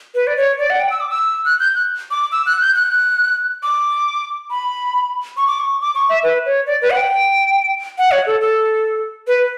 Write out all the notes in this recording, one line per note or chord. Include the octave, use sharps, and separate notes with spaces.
B4
D5
C#5
D5
F#5
G5
E6
D6
E6
F#6
G6
F#6
D6
E6
F#6
G6
F#6
D6
B5
C#6
D6
C#6
D6
C#6
E5
B4
C#5
D5
B4
F#5
G5
F#5
C#5
A4
A4
B4